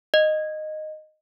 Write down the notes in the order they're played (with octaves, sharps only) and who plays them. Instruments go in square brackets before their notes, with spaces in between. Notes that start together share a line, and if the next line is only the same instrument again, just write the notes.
[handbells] D#5